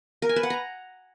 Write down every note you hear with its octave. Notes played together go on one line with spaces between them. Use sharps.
A#4
G#5
B4
F#5
A#5